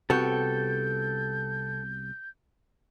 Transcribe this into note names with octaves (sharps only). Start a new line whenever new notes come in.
C2 C3 B3 F#4 A4 G5 G6